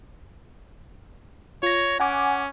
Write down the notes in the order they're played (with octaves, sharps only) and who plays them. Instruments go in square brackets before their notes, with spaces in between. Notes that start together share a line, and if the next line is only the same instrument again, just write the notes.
[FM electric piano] F4 A#6 [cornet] C#5
[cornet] C#4 [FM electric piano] F#5 G#5 D6